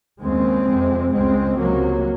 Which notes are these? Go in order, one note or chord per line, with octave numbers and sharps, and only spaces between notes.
D#2 C#3 G#3 C4
F2 C3
C#2 C#3 G#3 C4
C#2 C3 F#3 A#3